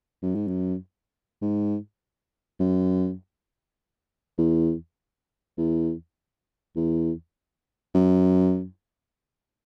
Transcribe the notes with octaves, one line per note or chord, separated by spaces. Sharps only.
F#2
G#2
F#2
G#2
F#2
E2
E2
E2
F#2